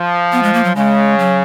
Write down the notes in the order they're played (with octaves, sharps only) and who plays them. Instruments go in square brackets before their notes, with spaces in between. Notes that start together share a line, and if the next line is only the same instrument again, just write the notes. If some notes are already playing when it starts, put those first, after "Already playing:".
Already playing: [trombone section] F3
[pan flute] B3
G#3
A#3
F#3
[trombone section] C#3 [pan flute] G#3
[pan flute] F#3